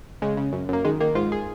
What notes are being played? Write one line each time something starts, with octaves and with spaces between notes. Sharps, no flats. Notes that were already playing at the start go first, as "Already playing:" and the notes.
C#3 G#3
C#3
F#2
F#2 A#3
D#3 G#3
D#3 A#3
G#2 F4
G#4